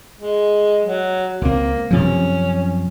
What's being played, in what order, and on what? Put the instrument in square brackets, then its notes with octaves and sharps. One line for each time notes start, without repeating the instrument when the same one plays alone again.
[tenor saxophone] G#3
F#3
[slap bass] C#2 C4 [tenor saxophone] A#3
[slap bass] F#2 C3 F3 [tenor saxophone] C#4